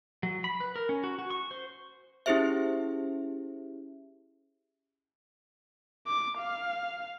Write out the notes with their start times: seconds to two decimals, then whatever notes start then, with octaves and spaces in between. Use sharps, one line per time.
0.23 F#3
0.44 B5
0.60 B4
0.76 A#4
0.89 C#4
1.04 F#4
1.19 F#4
1.30 C#6
1.51 C5
2.26 C#4 E4 G4 G#4 C5 E5
6.07 D6
6.39 F5